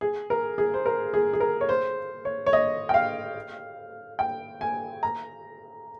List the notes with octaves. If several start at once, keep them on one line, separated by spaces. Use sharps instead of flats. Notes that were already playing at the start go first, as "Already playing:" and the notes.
G#4
A#4
G#4
C5
A#4
G#4
G#4
A#4
C#5
C5
C#5
C#5
D#5
G5
F5
G5
G#5
A#5